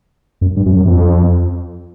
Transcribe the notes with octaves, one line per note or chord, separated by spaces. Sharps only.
F#2
G2
F#2
F#2
F2